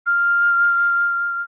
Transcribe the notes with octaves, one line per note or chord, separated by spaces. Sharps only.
F6